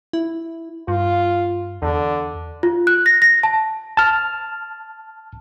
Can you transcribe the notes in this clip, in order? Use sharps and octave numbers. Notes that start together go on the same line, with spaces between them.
E4
G2 F4
E2 D3
F4
F#6
A#6
A#6
A5
A5 F6